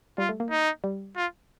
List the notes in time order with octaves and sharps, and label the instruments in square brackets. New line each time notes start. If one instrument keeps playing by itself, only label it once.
[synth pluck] G3 [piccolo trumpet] F4
[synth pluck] A3
A#3
[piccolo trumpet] D#4
[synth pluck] G3
[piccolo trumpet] F4